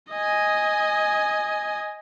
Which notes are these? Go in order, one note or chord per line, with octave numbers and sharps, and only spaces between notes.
D#5 G#5